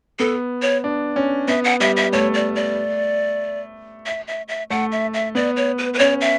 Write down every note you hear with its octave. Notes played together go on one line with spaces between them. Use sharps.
B3 A4
C#5
D4
C#4
B3 E5
F#5
G3 E5
E5
A3 C#5
D5
D5
E5
E5
E5
A3 F#5
E5
E5
B3 D5
C#5
B4
B4
C#4 C#5
E5